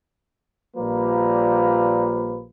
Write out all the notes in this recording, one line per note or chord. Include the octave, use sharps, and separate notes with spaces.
A#1 F3 G3 A#3 B4